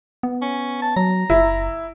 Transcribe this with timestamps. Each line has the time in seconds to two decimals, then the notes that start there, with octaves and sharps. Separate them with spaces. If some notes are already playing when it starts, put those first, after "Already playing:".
0.23 B3
0.42 C#4
0.82 A5
0.96 F#3 A#5
1.30 F#1 E4